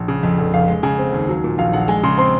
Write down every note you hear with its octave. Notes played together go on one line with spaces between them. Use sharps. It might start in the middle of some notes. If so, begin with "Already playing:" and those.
Already playing: A#1
C#3
F2
F1
F1 F5
G#3
C#3 G#5
C4
D#2
F#3
A#2
A#1 F5
A#1 F#5
G#3 G#5
C#3 C6
C4 C6